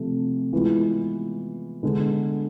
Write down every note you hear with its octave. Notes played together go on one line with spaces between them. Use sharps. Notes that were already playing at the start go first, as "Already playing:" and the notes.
Already playing: C3 F3 A3
E3 G#3 B3 F4
D3 G#3 B3